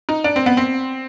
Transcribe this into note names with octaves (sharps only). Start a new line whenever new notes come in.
D#4
D4
C4
B3
C4